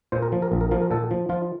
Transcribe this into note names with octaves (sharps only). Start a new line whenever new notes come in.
A#2 C5
A#4
F3
A#4
A#1
A#4
F3 A#4
A#4
A#2 A4
F3
F3 F4